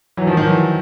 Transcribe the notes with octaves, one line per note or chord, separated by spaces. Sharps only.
E3 F#3
D#3 F3
D#3 F3
E3 F#3